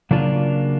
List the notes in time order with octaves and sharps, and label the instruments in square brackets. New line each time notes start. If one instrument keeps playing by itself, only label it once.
[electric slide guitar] C#3 F#3 A#3 D4 F4